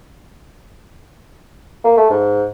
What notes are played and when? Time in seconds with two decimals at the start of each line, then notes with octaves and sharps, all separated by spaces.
1.84 A#3
1.98 A3
2.11 G#2